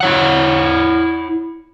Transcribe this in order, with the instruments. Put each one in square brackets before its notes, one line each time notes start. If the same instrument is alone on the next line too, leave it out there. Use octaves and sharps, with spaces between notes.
[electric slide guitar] E4 C#5 F#5